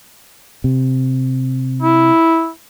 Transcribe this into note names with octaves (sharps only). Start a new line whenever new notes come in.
C3
E4